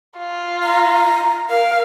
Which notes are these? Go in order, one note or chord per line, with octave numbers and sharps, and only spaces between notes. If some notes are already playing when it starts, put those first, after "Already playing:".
F4
A#5
A#4 F5